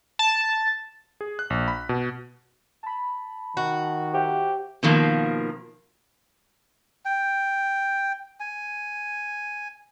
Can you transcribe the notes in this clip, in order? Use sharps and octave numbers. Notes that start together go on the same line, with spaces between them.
A5
G#4
F#6
A#1
B5
B2
A5 B5
D#3 F#4
G4 C5 E5 F#5
B2 D#3 F3 A#3
G5
G#5